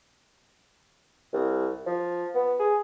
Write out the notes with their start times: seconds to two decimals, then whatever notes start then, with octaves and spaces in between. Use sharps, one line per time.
1.34 C2
1.87 F3
2.35 B3
2.60 G#4